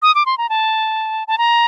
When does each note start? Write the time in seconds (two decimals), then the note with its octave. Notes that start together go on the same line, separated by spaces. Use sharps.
0.02 D#6
0.15 D6
0.26 C6
0.38 A#5
0.49 A5
1.28 A5
1.38 A#5